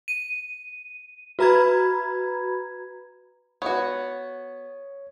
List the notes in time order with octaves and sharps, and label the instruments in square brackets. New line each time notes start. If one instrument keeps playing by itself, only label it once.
[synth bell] D#7
F#4 B4 A#5 B5 G#6
[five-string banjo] B3 F#4 [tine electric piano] C#5